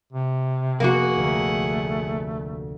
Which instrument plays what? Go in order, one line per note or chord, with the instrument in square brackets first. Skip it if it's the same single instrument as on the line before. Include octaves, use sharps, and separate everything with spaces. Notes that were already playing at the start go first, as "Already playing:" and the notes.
[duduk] C3
[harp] F1 B3 D#6 [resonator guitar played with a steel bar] A#3 F#4 [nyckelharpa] G#4 F#5
[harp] D2 A#5 [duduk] A3